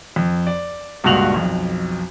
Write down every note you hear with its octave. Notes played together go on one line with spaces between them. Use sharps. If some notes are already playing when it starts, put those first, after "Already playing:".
F2
D5
C#2 G2 A#2 F#4 F7 F#7
B1 F2